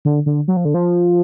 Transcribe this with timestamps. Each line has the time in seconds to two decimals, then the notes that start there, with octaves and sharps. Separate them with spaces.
0.05 D3
0.26 D3
0.48 F#3
0.57 F3
0.65 D3
0.74 F3